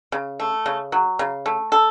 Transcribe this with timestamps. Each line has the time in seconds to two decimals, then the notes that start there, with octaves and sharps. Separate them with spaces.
0.12 C#3
0.40 A3
0.66 C#3
0.92 F#3
1.19 C#3
1.46 A3
1.72 A4